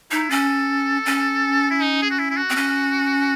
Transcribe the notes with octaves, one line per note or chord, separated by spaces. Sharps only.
D#4 E4
C#4 A4
C#4
E4
D#4
G#4
F#4
E4
E4
F#4
C4
C#4